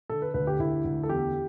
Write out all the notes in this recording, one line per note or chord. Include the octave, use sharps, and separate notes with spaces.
D3 A4
B4
D2 B4
G4
D2 E4
D2
A4
E2 G4